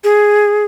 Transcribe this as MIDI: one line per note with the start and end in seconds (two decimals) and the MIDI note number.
0.04 0.65 68